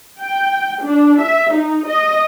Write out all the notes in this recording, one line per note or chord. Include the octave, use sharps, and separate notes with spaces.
G5
D4
E5
D#4
D#5